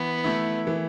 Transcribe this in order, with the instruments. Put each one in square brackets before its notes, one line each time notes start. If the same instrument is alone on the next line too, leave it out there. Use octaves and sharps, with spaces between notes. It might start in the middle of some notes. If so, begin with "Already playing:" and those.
Already playing: [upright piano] E3 [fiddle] B3
[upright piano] A3 E4
E3